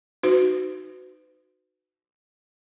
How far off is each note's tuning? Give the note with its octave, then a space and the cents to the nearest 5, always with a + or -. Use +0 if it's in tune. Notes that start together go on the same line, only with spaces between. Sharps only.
D#4 -5 F#4 +0 B4 +40